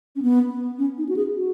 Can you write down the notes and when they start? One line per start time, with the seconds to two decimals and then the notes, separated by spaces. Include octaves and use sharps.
0.16 C#4
0.22 B3
0.79 C#4
0.98 D#4
1.09 F#4
1.17 G#4
1.36 F#4